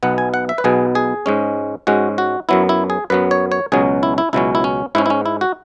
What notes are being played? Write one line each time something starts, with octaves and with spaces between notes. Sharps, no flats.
B1 B2 B3 F#5
G#5
F#5
E5
B4
B1 B2 B3 G#4
G#4
G#2 G#3 C#4
G#2 G#3 C#4 F#4
F#4
F#2 F#3 B3 E4
E4
G#4
F#2 F#3 B3 B4
C#5
C#5
C#2 B2 F#3 C#4 G#4
E4
E4
C#2 B2 F#3 C#4 E4
E4
C#4
G#2 G#3 C#4 E4
E4
C#4
E4
F#4